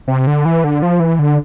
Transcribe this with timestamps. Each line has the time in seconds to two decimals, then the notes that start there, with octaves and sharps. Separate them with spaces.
0.08 C3
0.27 D3
0.45 E3
0.64 D3
0.82 F3
1.00 E3
1.19 D3